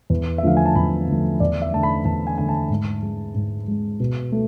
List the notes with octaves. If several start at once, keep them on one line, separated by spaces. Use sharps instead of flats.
E2
E5
D3 F3 A3 F5
G#5
A5
E2 B5
D3 F3 A3
E2 D5
E5
D3 A3 A5
B5
E2 A5
G#5
D3 A3 G#5
A5
G#2
G#3
G#2
G#3
B2
A3